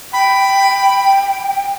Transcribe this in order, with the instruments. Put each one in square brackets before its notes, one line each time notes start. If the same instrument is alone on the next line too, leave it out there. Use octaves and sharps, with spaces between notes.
[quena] G5 [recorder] B5